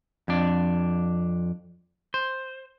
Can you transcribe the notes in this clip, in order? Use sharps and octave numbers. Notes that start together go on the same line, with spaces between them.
F2 D4
C5